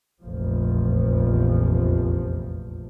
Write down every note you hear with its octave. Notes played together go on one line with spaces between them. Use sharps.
F1 A#1 E2 F3